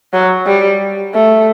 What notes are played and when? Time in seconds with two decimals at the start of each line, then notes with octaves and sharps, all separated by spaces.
0.13 F#3
0.47 G3
1.14 A3